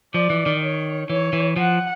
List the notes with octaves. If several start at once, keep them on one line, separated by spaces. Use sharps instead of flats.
F3 D5
E3
D#3
C#5
E3 C#5
E3
F3 F#5